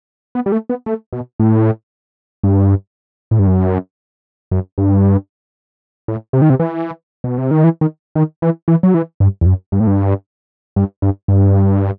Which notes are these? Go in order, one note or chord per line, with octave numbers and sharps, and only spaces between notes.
B3
G3
A3
B3
A3
B2
A2
G2
A2
G2
F#2
F#2
G2
A2
C3
D#3
C3
E3
B2
C3
D#3
E3
D#3
D#3
E3
E3
F#3
E3
G2
E2
F#2
G2
A2
G2
G2
G2
G2